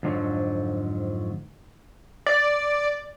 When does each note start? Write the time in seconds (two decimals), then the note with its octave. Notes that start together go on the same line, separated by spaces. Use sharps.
0.03 F2 G#2 D3 F3 F#3
2.26 D5